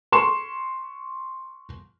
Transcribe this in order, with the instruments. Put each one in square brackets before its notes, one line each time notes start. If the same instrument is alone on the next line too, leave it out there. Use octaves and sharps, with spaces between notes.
[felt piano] C6 C#6 E7